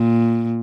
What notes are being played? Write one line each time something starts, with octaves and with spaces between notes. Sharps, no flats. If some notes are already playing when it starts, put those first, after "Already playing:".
Already playing: A#2